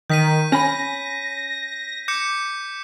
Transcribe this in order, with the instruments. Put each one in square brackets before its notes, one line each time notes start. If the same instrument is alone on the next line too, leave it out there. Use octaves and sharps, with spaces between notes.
[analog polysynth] D#3 [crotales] G6 B6 D#7
[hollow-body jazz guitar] C#4 G#5 B5 [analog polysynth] A#6
[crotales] D6 G6 C#7